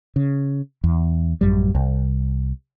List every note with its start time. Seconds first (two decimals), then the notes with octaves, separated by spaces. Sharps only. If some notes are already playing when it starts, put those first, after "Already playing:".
0.16 C#3
0.84 E2
1.41 A1 F#2 G3
1.75 C2